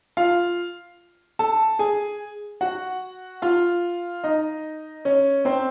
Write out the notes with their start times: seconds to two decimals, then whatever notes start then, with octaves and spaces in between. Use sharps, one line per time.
0.17 F4 F5
1.39 A4 A5
1.79 G#4 G#5
2.61 F#4 F#5
3.42 F4 F5
4.24 D#4 D#5
5.05 C#4 C#5
5.45 C4 C5